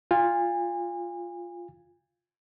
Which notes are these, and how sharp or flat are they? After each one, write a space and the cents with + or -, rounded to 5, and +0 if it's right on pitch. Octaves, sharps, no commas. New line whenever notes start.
F4 +0 G#5 -35